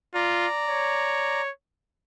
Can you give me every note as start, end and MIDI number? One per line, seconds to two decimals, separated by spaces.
0.15 0.47 65
0.15 1.41 74
0.15 1.41 82
0.68 1.51 73